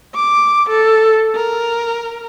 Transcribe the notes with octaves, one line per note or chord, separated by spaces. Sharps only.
D6
A4
A#4